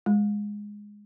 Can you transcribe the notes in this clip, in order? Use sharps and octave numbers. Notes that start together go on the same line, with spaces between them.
G#3